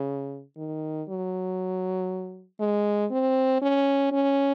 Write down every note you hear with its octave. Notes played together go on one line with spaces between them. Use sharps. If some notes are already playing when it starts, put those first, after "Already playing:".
Already playing: C#3
D#3
F#3
G#3
C4
C#4
C#4